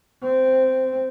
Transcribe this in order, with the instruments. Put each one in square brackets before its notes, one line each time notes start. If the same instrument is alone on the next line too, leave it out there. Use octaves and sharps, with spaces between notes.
[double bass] C4